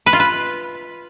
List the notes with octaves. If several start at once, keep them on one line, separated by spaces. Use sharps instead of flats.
B4
F4
B4